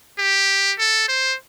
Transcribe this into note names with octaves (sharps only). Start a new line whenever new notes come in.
G4
A4
C5